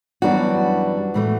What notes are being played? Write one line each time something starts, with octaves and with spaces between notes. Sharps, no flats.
F#2 E3 G3 B3 D4 F#4
A2 E3 A3